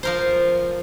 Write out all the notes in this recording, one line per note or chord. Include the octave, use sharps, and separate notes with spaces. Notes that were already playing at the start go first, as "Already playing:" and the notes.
F3 A#4 C5